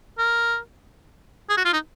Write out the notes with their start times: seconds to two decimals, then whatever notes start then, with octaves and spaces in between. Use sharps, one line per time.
0.18 A#4
1.50 G#4
1.57 F#4
1.65 F4
1.73 D#4